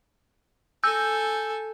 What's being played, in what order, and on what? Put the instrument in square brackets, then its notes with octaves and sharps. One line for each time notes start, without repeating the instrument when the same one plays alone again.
[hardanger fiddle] A4 G#5 [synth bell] E6 G6